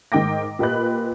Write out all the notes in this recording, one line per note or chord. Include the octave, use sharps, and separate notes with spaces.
G#2 D#3 G5 D6 A#6
A#2 G4 B4 D#5 B5 F#6